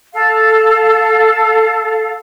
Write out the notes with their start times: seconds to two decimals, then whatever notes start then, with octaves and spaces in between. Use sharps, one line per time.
0.13 A4 F5